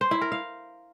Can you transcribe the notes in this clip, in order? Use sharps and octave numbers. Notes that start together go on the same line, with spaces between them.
C5
E4
A#4
F5